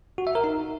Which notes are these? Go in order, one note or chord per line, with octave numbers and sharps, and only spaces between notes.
F#4
E5
A#4
D#4